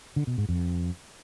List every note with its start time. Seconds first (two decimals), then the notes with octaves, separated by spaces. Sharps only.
0.16 D3
0.27 B2
0.38 G#2
0.49 F2